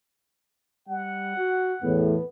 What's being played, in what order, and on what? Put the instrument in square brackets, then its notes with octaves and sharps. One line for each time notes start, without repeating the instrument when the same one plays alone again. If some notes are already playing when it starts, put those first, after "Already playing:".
[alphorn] G3 [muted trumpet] F#5
[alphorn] F#4
[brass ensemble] E2 A2 [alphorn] B3